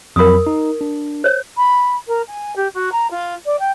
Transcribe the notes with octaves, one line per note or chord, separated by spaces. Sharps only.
F2 F#3 A#4 B5 D#6
D#4
D4
C5 C#5
B5
A#4
G#5
G4
F#4
A#5
F4
D5
G5